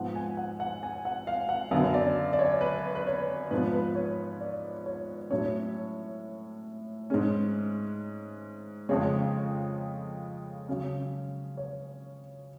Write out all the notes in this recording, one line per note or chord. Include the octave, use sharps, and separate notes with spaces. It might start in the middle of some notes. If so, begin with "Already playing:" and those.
Already playing: G#2 F3 B3 F#5
G#5
F#5
F#5
G#5
F#5
F5
F#5
F#2 D3 F#3 B3 F5
D5
D5
C#5
B4
B4
C#5
G#2 F3 B3 B4
B4
C#5
D5
C#5
A2 F#3 C#4 C#5
G#2 G#3 C#4
F2 C#3 G#3 C#5
C#3 F#3 C#4
C#5